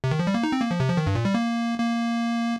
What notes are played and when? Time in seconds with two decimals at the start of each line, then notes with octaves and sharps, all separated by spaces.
0.04 C3
0.11 D#3
0.19 F3
0.27 G3
0.34 A#3
0.43 D#4
0.52 C4
0.62 A#3
0.71 F3
0.80 C3
0.89 F3
0.97 D#3
1.07 G2
1.15 A#2
1.25 G3
1.34 A#3
1.79 A#3